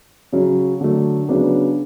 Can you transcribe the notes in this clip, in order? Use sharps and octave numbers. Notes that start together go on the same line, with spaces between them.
C#3 F#3 C#4
D3 F#3 A3
C#3 F#3 B3 D4